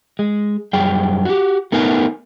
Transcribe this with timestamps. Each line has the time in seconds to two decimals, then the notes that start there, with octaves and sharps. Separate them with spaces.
0.19 G#3
0.73 F#2 G3 G#4 G5
1.25 F#4 G4
1.72 A3 B3 D#4 A#4 B4 G#5